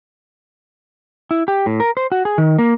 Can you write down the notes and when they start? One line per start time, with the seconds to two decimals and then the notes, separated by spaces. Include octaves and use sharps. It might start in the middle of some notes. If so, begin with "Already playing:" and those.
1.31 E4
1.48 G4
1.66 A2
1.80 A#4
1.97 C5
2.12 F#4
2.25 G#4
2.38 D#3
2.58 A#3